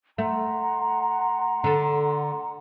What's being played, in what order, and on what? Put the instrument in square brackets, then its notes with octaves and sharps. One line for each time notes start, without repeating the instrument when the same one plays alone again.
[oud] A3 [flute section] F#5 A#5 C6
[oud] D3 A4